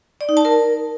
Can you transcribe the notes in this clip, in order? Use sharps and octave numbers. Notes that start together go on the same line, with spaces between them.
D5
D#4
A5
A#4